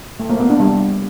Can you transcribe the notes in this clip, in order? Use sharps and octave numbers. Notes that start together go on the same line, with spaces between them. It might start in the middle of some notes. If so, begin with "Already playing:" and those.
A3
A#3
B3
D4
G3